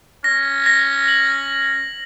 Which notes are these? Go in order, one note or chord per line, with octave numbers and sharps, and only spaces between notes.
C#4 A#6
A#6
F#7